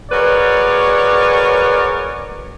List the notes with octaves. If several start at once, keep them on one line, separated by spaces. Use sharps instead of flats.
F#4 G#4 A#4 B4 C#5 D5